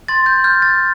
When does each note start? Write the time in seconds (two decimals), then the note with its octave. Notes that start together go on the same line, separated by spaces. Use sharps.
0.08 C6 A6
0.26 G6
0.44 F6 G6
0.62 A6